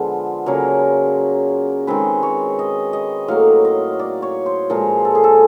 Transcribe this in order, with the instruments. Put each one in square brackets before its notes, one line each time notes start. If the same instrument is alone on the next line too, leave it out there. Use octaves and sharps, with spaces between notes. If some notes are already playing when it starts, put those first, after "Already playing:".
Already playing: [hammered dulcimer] D3 F3 G#3 B3 F4
C#3 F#3 A#3 A#4
D#3 G#3 C4 B4
C#5
D#5
D#5
A2 F#3 A#3 F5
D#5
D5
C#5
C5
A#2 F3 G#3 A#4
A4
G#4
A4